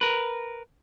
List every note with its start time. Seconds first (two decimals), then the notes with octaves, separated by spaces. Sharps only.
0.01 A#4 B4